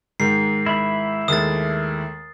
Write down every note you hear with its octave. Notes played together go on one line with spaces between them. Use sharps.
G#2 D#3 G#3 C7
E4 B5
D#2 G#3 A3 D#6 A6